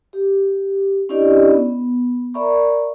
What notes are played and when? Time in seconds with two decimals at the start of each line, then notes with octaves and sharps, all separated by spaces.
0.13 G4
1.09 C#4 D4 E4 G4 D5 D#5
1.51 B3
2.34 A#4 D5 E5 A#5 B5 C#6